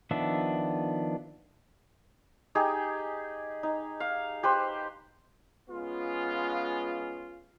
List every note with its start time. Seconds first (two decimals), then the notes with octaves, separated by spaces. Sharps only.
0.11 D#3 F3 B3 D4 E5
2.55 D#4 G4 G#4
3.63 D#4
4.00 F5
4.43 G4 B4 C5
5.70 G#3 B3 C#4 F4